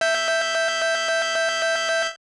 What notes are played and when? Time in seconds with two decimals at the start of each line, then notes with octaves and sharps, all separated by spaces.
0.01 E5 G6